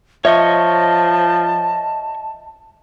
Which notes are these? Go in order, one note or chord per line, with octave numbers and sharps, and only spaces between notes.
F3 C#5 D#5 E5 A5 C#6